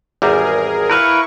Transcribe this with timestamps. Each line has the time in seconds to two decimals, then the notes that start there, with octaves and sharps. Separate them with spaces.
0.22 G#1 E2 G3 G#4 A#4
0.90 E4 A#4 B4 F5 C#6